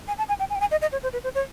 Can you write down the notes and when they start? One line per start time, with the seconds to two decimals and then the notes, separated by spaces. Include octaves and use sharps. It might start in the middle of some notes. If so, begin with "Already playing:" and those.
0.08 G#5
0.18 A5
0.29 G#5
0.39 G5
0.50 G#5
0.55 G5
0.60 G#5
0.71 D#5
0.82 D#5
0.92 C#5
1.03 C5
1.13 B4
1.24 C5
1.35 C#5